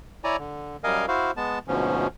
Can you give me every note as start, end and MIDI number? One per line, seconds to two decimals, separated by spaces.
0.24 0.36 64
0.24 0.36 73
0.24 0.36 74
0.24 0.36 80
0.24 0.36 82
0.39 0.77 50
0.84 1.06 42
0.84 1.06 55
0.84 1.06 70
0.84 1.06 75
0.84 1.06 77
0.84 1.06 80
1.08 1.31 64
1.08 1.31 66
1.08 1.31 72
1.08 1.31 77
1.37 1.59 56
1.37 1.59 59
1.37 1.59 81
1.68 2.07 38
1.68 2.07 44
1.68 2.07 47
1.68 2.07 53
1.68 2.07 61